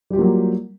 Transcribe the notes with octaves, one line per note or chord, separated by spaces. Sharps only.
F#3 G3 A#3 F4 G4